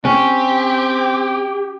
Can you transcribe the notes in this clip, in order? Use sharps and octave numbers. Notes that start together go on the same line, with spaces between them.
C4 C#4 G4